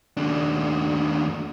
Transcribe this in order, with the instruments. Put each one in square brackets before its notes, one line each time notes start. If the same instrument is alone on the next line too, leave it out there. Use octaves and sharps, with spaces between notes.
[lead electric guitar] D#2 D4